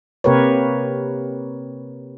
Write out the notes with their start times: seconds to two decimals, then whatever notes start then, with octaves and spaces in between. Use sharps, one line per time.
0.24 C3 A#3 G4 A#4 B4 C#5